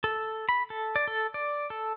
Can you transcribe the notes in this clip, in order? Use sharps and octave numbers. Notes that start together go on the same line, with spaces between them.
A4
B5
A4
D5
A4
D5
A4